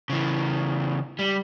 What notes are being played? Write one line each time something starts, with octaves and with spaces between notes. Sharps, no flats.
C#3 E3
G3